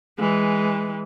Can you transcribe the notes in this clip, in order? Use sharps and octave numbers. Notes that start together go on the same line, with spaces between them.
E3 G#3